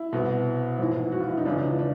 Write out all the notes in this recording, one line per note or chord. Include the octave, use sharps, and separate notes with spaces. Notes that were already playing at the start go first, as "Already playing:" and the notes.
Already playing: E4
C2 B2
A#1 G#2 E3
F#4
F4
E4
D#4
C#2 C#3 E3 D4
D4